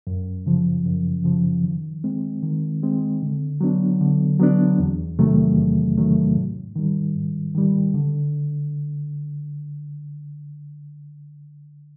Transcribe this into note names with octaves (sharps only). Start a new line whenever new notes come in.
F#2
C#3 F3
F#2
C#3 F3
D#3
G#3 C4
D#3
G#3 C4
D3
F#3 B3 D4
D3
F#3 B3 D4
E2
C3 D#3 F#3 A3
E2
C3 D#3 F#3 A3
G#2
D#3 G3
G#2
D#3 G3
D3